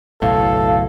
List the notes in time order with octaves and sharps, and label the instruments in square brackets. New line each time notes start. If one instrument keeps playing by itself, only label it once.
[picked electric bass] F#1 B1 A2 [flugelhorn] A4 [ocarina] F5